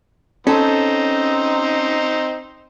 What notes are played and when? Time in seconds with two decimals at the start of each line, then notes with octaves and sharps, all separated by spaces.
0.47 C4 C#4 D#4 A4